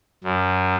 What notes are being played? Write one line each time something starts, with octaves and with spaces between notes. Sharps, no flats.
F#2